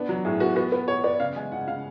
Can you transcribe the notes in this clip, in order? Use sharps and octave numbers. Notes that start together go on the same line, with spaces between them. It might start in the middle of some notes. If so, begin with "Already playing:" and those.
Already playing: B3 D4
F#3
A2 G#4
B3 F#4
B3 F#4
B3 B4
B3 C#5
B3 D5
C#3 F5
G#3 G#5
C#3 F#5
C#3 F5